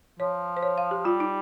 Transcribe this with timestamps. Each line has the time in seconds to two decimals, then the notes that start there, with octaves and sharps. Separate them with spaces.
0.20 F3 C#5
0.57 C5
0.63 C#5
0.78 F5
0.91 G4
1.05 G3 F4
1.20 D#4